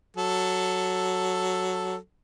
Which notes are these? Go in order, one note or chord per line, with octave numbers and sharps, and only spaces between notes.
F#3 A4